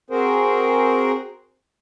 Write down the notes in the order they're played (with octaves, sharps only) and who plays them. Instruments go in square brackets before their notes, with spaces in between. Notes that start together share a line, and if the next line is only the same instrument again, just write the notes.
[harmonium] C4 F#4 G#4 A#4 C5